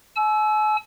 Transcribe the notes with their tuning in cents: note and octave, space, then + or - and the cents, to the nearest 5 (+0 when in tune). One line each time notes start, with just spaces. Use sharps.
G#5 +45 E6 +0